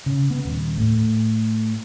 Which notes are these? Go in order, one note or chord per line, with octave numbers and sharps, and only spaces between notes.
C#3
B3
D#1
A2